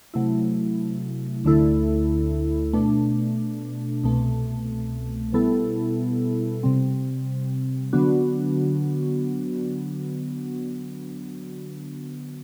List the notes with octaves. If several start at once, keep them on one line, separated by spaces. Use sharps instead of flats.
C3 F#3 A3 E4
D2 D3 A3 E4 A4
B2 A3 D4
C2 B2 A3
B2 G3 B3 E4 A4
C3 G3 C4
D3 F#3 B3 D4 F#4